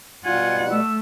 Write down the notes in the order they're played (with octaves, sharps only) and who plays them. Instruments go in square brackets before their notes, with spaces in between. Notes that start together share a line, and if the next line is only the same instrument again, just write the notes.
[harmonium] B2 G3 [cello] F4 F#5 [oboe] G#5
[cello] A3 [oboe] E6